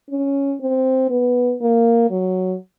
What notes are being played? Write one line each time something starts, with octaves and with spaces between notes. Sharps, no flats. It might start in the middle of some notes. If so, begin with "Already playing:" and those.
C#4
C4
B3
A#3
F#3